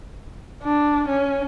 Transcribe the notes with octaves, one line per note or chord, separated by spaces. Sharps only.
D4
C#4